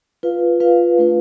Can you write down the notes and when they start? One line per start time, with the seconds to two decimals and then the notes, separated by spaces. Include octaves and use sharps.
0.23 F4 B4 F5
0.60 F4 B4 F5
0.98 A3 D4 F4 B4 F5